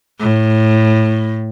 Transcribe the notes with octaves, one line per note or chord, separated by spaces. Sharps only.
A2